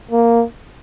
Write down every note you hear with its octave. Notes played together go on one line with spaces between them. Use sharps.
A#3